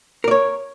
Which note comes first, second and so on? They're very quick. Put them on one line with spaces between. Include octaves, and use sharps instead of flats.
A#4 D5 C#5